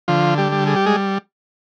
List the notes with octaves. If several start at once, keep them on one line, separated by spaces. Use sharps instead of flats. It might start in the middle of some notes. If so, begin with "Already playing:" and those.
D3 F3 F4
G3 G4
G3
G#4
G4
G#3 G#4